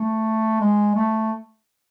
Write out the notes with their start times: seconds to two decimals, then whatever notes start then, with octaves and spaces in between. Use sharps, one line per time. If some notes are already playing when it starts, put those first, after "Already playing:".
Already playing: A3
0.60 G#3
0.95 A3